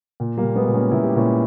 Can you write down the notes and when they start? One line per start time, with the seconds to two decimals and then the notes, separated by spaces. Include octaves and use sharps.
0.20 A#2
0.37 G3 A#3
0.43 A#2
0.56 G#3 B3
0.68 A#2
0.74 A#3 C#4
0.91 A#2 E4
1.04 G4
1.16 A#2 C#4 E4